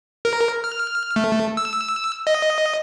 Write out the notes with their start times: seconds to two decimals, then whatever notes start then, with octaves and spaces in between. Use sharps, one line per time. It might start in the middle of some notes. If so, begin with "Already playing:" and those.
0.25 A#4
0.64 F6
1.16 A3
1.57 E6
2.27 D#5